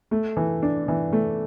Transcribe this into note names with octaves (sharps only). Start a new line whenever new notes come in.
A3
E3
D4
E3
A3